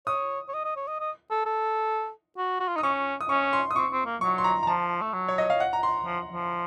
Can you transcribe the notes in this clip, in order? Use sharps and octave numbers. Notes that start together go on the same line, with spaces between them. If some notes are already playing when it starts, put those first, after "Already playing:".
C#5 D#6
C#5
D#5
D#5
C#5
D#5
D#5
A4
A4
F#4
F#4
F4
D#4 D#6
C#4 C#6
D#6
C#4 C#6
C6
D#6
C4 C#6
C4
A#3
F#3 C#6
C6
A#5
A#5
F3 A5
A3
F#3
C#5
D#5
F5
F#5
A#5
C6
F3
F3